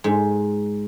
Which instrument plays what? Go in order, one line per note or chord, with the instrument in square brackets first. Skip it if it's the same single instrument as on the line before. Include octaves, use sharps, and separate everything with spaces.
[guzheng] G#2